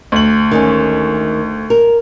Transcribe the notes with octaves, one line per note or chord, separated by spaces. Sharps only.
D2 F#7
D#3 G#3 C#4
A#4